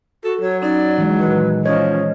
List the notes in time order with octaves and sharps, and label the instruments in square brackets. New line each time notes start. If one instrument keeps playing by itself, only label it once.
[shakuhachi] F#4 [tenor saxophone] A4
[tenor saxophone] F#3 [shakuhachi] C#5
[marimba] C#4 D#4 [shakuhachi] D5
[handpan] E3 G#3
[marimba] A#2 D#3 [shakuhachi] B4
[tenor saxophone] F3 [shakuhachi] C#4 [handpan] C#5 D#5 [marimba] G#6